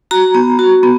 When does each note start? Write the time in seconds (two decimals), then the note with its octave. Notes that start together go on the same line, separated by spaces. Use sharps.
0.11 F#4 A#5
0.35 B3
0.59 F#4
0.83 B3